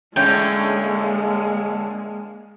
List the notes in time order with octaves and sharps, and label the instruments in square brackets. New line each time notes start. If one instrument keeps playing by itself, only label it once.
[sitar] A2 D3 C#4 [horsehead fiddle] G#3 A#3 [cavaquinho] G5